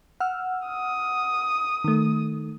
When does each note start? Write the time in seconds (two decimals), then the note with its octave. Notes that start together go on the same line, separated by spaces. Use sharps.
0.20 F#5 E6 F6
0.67 D#6
1.84 D#3 A3